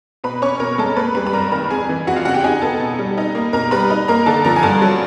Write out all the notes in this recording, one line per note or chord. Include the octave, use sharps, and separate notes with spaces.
B2 B4 B5
C#4 C#5 C#6
B2 A#4 A#5
G#3 A4 A5
A#3 B4 B5
G3 B4 B5
B5
G2 A#4 A#5
D#3 A#4 A#5
F2 G#4 G#5
E3
F2 F#4 F#5
F4 F5
C#3 F#4 F#5
G4 G5
D#4 G#4 G#5
B3 A4 A5
B2
G3
D#4
A#3
B2 A#4 A#5
G3 B4 B5
D#4
A#3 A#4 A#5
D3 A4 A5
F3 A#4 A#5
G#5
G2 A4 A5
F#3